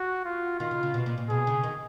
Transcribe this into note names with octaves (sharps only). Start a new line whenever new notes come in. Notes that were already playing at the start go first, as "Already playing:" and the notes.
Already playing: F#4
F4
D#3 F4
C#3
C#3
B2
A#2
A#2
B2 G#4
C#3
D#3